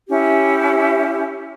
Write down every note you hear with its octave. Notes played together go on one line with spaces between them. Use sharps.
C#4 E4 G4